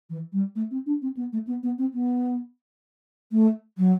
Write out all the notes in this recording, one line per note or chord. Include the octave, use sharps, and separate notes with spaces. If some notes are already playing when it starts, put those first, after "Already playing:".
E3
G3
A3
C4
D4
C4
B3
A3
B3
B3
C4
B3
A3
F#3